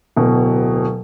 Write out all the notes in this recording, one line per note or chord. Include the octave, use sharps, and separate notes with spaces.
D1 B2